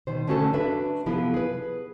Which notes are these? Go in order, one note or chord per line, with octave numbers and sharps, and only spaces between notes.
B2 D#3 C5
D3 A3 C#4 F#4 G4 A4
D4 F#4 B4 E5
C3 F3 B3 E4 G#4 A4
G#4 B4